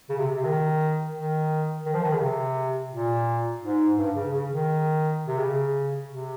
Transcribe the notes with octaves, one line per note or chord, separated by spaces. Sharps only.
C#3
C3
C3
D#3
D#3
D#3
F3
D#3
C#3
C3
A#2
G#2
G2
C#3
C#3
D#3
C3
C#3
C3